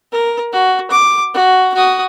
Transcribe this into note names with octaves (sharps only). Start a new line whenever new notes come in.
A#4
F#4
D6
F#4
F#4 D#6